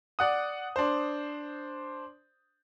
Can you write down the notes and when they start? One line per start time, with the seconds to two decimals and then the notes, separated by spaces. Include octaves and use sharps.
0.19 D5 F#5 D#6
0.76 D4 C5